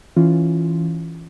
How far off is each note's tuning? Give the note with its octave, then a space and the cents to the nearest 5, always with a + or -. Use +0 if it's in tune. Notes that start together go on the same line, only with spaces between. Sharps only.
E3 +0 C#4 +0 F4 +0